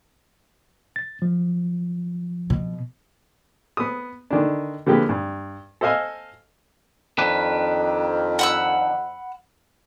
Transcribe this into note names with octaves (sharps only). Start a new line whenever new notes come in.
A6
F3
B2
B3 D#6
D3 D#3 D4
D3 F3 A#3 G4 G#4 B4
G2
A4 C5 D#5 F5 G#5
F2 D#3 D4 B4
F#5 B5 E6